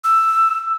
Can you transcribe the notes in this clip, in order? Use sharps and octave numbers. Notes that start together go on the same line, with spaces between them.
E6